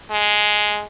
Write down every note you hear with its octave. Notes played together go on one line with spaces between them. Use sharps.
G#3